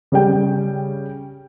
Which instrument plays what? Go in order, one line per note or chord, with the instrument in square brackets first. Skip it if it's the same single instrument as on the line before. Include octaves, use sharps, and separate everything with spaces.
[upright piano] C#3 G3 G5